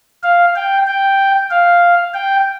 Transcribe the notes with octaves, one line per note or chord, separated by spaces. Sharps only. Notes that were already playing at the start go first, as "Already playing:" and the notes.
F5
G5
G5
F5
G5